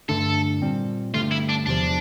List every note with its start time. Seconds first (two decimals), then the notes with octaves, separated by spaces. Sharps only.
0.09 G2 D3 A3 D4 A4
0.62 A#2 G3 C4
1.14 G2 D3 A3 F4
1.32 E4
1.49 D4
1.66 E2 C3 F3 D4